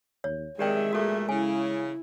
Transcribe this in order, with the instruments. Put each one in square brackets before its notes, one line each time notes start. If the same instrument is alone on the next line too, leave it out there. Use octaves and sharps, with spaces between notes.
[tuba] D#2 [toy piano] C#5
[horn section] C3 D#3 [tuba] G#3 [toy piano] G4 D5 G5 [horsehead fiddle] G#4 E5
[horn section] A#2 A3 [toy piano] F#4 A4
[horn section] C#3 [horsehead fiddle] E4 [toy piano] G#5